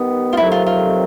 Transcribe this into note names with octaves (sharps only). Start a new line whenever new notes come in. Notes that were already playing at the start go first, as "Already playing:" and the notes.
Already playing: D#3 G3 B3
F4
F2 C3 D#3 F#3 A3 E4
F4
F4